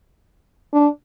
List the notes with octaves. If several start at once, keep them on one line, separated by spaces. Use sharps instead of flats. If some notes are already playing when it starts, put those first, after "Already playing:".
D4